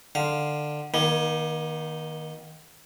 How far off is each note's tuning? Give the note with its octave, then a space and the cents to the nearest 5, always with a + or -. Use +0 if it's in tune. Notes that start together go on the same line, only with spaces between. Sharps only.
D3 +20 F5 +0
D#3 +0 A#3 +40